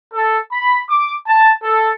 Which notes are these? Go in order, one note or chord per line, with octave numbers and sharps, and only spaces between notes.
A4
B5
D6
A5
A4